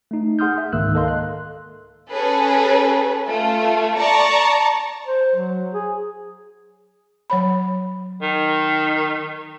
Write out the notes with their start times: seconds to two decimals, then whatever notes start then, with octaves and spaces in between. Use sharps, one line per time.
0.11 A3 D#4
0.39 G#4 F#5 C6 D#6 F6 G6
0.58 E5
0.73 C#2 G#2 D#3 A#3 E6 F#6
0.95 A4 A#4 D#5 F5 C6
1.08 F#6
2.11 C#4 G#4 A4 B4
3.28 A3 F4
3.99 D5 A5 A#5 C#6
5.07 C5
5.35 F#3
5.74 G#4
7.30 F#3 C#5 B5
8.22 D#3